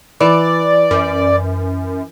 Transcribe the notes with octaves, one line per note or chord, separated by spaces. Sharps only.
E3 D5
F#2